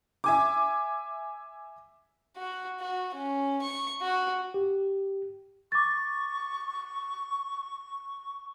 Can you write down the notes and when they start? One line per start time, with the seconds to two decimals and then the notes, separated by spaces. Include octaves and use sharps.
0.24 E5 G#5 D6
2.37 F#4
2.80 F#4
3.15 C#4
3.62 C#6
4.01 F#4
4.54 G4
5.72 C#6 D6 A6